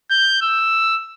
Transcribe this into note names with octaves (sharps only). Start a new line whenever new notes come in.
G6
E6